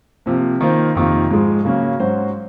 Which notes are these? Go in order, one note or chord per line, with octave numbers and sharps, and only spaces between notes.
C3 F3 A#3
D#3 A#3 F4 C5
F2 C3 D#3 A#3 F4
G#2 F3 G#3
C#3 F#3 A#3 C#4
G#2 F#3 C#4 F#4 C5